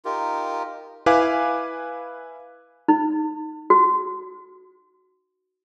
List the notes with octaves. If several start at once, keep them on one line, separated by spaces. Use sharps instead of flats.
D#4 F4 G4 A#4
E4 B4 F5 G#5 D6
D#4
F#4